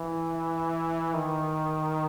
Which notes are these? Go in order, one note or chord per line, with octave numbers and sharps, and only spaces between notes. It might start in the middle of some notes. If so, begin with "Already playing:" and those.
Already playing: E3
D#3